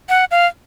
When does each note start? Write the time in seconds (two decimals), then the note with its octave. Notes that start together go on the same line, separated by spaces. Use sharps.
0.09 F#5
0.31 F5